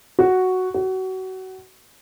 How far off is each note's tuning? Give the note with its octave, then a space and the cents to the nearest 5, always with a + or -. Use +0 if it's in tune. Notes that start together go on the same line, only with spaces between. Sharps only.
F#4 +0
F#4 +25